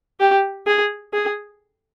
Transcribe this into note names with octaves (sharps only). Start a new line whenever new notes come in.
G4
G#4
G#4